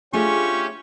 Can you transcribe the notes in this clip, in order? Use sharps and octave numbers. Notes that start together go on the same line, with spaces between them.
A3 C#4 D4 F4 G4 G#4 C#6